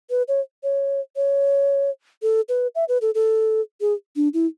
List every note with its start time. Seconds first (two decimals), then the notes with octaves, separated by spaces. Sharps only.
0.10 B4
0.28 C#5
0.63 C#5
1.16 C#5
2.22 A4
2.49 B4
2.75 E5
2.89 B4
3.02 A4
3.15 A4
3.81 G#4
4.16 D4
4.34 E4